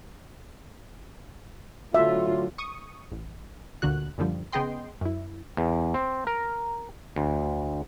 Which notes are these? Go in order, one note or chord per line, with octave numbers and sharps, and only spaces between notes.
A2 D3 F#3 F4 F#4 E5
C#6 D#6
A1
D2 A#2 D3 F#4 F#6
F#2 A#2 D3 F3 G3
C#3 B3 G#4 D#5 G5 C6
F#2 E4
E2
C4
A#4
D2